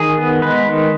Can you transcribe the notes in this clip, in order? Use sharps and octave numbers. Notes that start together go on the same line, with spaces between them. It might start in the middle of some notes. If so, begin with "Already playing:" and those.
Already playing: D#3 G#4
B3
G#3 B4
D#3